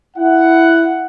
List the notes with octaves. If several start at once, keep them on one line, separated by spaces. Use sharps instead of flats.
E4 F#5